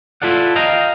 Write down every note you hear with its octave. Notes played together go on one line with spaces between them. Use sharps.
E4 F4 A4 D5 F#5
D#5 F5 G5 A#5